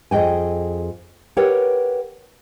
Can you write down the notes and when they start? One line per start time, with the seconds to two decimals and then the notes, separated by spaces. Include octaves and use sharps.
0.11 F2 G#4 D#5 G5 G#5
1.37 G4 A#4 B4 C#5 F#5 G5